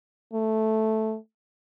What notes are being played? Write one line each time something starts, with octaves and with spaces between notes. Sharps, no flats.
A3